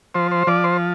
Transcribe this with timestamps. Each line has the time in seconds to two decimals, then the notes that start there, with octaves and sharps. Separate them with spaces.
0.15 F3 C5
0.31 C5
0.47 F3 D5
0.64 C5